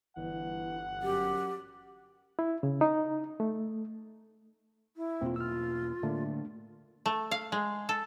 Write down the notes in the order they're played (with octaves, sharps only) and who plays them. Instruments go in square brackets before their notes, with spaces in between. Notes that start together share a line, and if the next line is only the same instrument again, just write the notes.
[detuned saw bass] G1 [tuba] E3 [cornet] F#5
[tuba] F#2 [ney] G4
[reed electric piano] E4
C#3
D#4
A3
[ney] E4
[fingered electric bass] E2 B2 A#3 [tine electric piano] C4 F4
[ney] F4 [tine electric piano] E6 F6
[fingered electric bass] A2 D3 [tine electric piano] A3 A#3 D4
[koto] A3
F5
G#3
A4